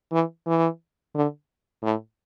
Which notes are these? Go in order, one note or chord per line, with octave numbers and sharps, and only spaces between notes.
E3
E3
D3
A2